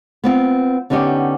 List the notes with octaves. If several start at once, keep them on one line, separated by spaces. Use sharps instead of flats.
B3 C4 F4
D3 B3 C#4 D#4 G4